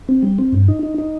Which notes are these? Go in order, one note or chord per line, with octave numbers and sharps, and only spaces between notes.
C4
G3
C4
G2
D#4
D#4
D#4